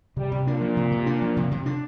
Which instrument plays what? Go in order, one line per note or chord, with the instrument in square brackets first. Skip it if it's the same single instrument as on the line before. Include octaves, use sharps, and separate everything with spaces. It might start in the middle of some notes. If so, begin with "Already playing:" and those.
[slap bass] C3 [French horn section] G3
[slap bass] C3
[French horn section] A#2 [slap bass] D4
[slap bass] F3
C3
C3
D4
F3
C3
C3
D4